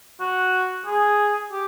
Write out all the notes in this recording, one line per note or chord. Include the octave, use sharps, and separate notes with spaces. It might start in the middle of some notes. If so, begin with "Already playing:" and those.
F#4
G#4
G4